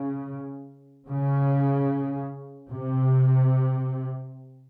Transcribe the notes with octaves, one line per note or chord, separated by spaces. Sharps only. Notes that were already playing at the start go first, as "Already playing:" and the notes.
Already playing: C#3
C#3
C3